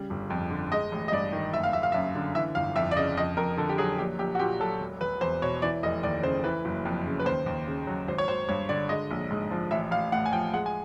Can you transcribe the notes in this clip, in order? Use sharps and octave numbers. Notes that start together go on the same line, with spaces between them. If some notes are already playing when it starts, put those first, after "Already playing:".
Already playing: C#3 G3
G1
F2
D3
G#3 D#5
A1
D#5
G2 D5
D#3
F#1 E5
F5
F#1 E5
F5
F#2 E5
D3
E3 E5
G1 F5
F2 E5
D5
C#3 D#5
F2 D#5
F2 A#4
D3 A4
G4
F#3 G#4
A#1 G4
A#1 G4
F#4
A#2 G4
F#3 A4
E1
E1 B4
E2 C5
B2 C#5
E3 D5
F1 D#5
D#2 D5
C#3 C5
E3 B4
F#1
F2
C#3
B4
D#2 C5
D#2
C#3
F#3
G#1 C5
C#5
G#1 C5
G2 C#5
D3 D5
G#3 D#5
A#1
G#2
F3
A1 E5
A1 F5
A2 F#5
G#5
F3 G5
G#3 F#5
G#5